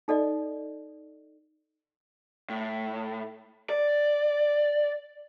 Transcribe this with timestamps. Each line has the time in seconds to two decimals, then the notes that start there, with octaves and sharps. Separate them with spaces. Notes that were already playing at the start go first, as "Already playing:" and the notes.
0.08 D#4 A4 D5 D#5
2.49 A2
3.70 D5